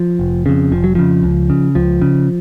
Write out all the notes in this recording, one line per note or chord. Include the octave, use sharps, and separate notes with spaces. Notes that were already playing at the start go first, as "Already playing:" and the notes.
Already playing: F3
F1
F2 C#3
F1 F3
F#3
F2 C#3 F3
C#2
C#3
C#2 F3
C#3